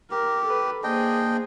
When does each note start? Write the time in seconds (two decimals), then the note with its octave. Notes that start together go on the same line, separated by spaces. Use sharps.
0.11 G4 A#4
0.46 A4 B4
0.84 A#3 D4 G#4 C5 D#5 G5